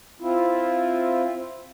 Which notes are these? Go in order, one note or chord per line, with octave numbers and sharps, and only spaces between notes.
C4 E4 F4